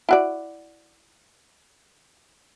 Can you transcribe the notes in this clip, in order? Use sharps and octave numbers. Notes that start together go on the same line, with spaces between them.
E4 F#4 D5